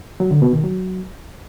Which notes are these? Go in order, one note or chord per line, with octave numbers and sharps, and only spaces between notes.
F#3
D3
B2
D#3
F#3